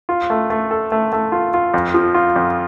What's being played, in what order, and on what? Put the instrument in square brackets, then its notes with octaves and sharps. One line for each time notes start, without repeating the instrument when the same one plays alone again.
[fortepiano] F4
A3
A3
A4
A3
A3
F4
F4
F2
F3
F4
F2